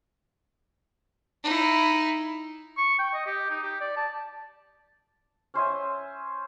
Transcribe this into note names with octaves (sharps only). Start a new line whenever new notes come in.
D#4 E4
C#6
G5
D#5
G4
D#4
G4
D5
A5
C#4 C5 E5 G#5